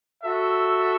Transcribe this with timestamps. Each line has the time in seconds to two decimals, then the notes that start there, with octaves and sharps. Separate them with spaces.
0.22 F#4 A4 E5